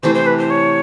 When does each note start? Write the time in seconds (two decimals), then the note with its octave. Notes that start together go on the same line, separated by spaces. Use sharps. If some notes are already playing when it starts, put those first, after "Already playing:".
0.03 C3 E3 A3 C5
0.14 C5
0.26 B4
0.38 C5
0.50 C#5